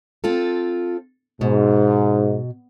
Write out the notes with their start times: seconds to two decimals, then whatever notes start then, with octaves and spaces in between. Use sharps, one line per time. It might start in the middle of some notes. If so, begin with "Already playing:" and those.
0.24 C4 F4 A4
1.41 G#2 B2